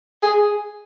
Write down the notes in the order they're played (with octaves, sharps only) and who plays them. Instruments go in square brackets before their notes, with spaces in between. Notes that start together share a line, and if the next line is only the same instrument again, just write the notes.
[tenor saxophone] G#4